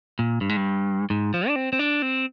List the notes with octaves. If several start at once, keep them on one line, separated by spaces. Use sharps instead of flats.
A#2
G2
G#2
G2
G#2
F3
D4
C4
C4
D4
C4